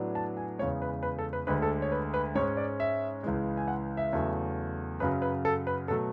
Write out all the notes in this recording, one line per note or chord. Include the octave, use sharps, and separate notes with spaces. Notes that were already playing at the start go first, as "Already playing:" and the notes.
Already playing: A2 F#3 B3 D4
A5
G#5
E2 C#3 G#3 C#5
B4
B4
A4
B4
D2 D3 G#3 B4
A4
C#5
B4
B4
G#2 G#3 C#4 C#5
D5
E5
C#2 C#3 E3 G#3
G#5
F#5
E5
E2 C#3 F#3 A3
F#2 C#3 F#3 B4
B4
A4
B4
B2 F#3 A3 A4